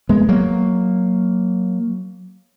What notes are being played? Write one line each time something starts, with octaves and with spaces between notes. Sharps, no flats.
G#3 B3
F#3 A#3